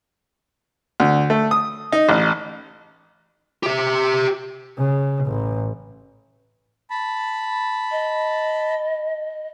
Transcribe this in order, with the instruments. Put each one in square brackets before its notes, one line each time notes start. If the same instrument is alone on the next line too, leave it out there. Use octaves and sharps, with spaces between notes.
[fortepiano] D2
A3
D#6
D#4
A1
[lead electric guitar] G4 E5
[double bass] C#3
A1
[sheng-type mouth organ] A5 B5
[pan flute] D#5